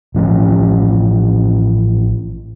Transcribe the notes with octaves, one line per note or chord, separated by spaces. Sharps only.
A1 F3 G3 C#4